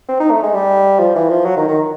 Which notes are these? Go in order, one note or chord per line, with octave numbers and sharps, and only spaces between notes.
C4
D#4
A3
G#3
G3
F3
E3
F3
F#3
D#3
D#3